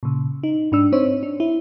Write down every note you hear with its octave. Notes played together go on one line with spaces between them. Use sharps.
A#2 C#3
D#4
G#2 D4 E6
C4 D#4 C5 C#5
D4
E4